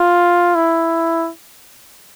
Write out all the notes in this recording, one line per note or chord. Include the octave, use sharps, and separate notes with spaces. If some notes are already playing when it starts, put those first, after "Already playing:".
Already playing: F4
E4